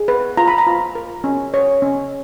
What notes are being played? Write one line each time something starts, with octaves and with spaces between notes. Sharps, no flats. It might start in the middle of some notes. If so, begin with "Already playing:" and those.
Already playing: G#4
B4
F4 A#5
B5
A#5
F4
A#4
C#4
C#5
C#4